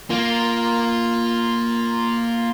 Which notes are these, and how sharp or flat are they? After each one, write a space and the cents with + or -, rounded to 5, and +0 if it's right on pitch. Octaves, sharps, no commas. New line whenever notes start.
A#3 +0 F4 +0